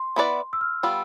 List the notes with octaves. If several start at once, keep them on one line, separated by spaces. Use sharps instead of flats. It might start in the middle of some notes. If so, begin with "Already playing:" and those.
Already playing: C6
B3 E4 B4 D5
E6
F6
G3 B3 F4 E6